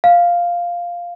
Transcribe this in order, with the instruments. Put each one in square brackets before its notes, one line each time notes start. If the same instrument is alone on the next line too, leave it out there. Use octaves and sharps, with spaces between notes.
[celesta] F5